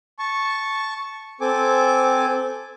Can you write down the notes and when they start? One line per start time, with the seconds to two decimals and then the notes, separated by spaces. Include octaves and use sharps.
0.19 A5 C#6
1.41 C4 A4 G#5 D6